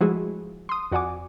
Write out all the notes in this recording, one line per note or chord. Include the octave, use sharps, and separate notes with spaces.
F3 G#3 A3 E4 F#4 G#4
C6 D#6
F2 F#4 D5 F#5 G#5 D6